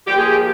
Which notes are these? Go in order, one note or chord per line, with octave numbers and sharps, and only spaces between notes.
A#2 F3 A#3 G4
G#4
G4